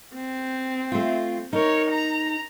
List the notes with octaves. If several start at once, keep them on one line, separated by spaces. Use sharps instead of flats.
C4
A3 F4
D#4 A#4 C#5
A#5